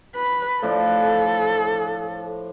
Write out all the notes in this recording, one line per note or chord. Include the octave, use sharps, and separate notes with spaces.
B4
A2 F3 D4 A4